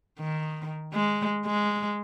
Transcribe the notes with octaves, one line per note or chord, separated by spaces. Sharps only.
D#3
G#3
G#3